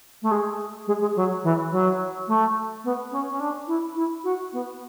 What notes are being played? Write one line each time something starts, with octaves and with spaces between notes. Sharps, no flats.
A3
G#3
G#3
G#3
F#3
E3
F#3
A3
B3
C#4
C#4
D4
E4
E4
F#4
B3